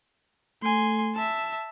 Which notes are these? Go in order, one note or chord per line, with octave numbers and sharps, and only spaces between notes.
A3 G#5 C6
E5 A5